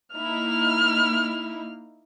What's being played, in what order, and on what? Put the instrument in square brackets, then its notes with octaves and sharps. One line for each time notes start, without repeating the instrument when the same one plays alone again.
[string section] A#3 D#4 E4 [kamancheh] F6